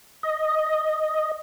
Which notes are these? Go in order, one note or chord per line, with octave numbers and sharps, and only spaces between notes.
D#5